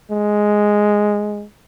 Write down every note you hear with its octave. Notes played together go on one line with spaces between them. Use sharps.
G#3